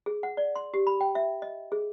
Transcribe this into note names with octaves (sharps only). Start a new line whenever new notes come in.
G#4
F#5
D5
C6
G4
B5
G5
E5
D#5
G#4